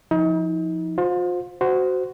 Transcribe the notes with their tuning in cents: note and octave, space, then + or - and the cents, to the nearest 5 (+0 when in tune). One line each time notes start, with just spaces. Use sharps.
F3 +0 D#4 +40
F4 +40 C5 +0
F#4 +5 C5 -15